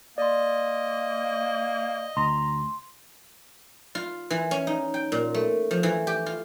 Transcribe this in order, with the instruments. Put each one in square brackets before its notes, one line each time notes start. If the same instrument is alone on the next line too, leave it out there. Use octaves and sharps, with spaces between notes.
[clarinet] A#3 [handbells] D5 C6 [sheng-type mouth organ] D#5
[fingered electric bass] D2 [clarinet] A#5 [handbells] C6
[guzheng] F4
E3
C#4
D#4
G5
A#2
A3
F3
E3
G4
F4